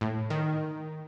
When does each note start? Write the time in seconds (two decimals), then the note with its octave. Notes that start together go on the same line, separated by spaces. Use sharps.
0.01 A2
0.30 D#3